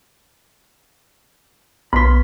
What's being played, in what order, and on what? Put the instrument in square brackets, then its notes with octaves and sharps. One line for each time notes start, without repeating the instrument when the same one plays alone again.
[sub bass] B1 [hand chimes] B3 B6 [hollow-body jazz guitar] B5 C6